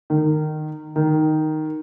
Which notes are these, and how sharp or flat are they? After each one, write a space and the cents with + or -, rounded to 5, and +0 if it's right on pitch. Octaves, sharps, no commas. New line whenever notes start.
D#3 -20
D#3 +0